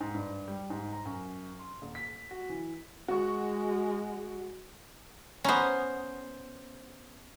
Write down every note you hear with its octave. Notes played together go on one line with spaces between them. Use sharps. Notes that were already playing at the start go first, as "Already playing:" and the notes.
G#2
G2
G3
G#2
A#5
F#2
C6
D#1
B6
F#4
E3
G#3 F#4 C#6
B3 C#4 C5 A#5